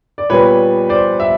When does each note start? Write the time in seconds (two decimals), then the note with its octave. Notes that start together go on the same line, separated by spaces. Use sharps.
0.18 D5
0.30 A#2 G3 B3 B4 C#5
0.89 C5 D5
1.20 E5